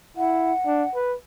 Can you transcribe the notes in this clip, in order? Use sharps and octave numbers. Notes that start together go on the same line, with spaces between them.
E4 F#5
D4
B4